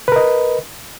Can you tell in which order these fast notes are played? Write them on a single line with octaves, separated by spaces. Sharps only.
B4 A#4 D#5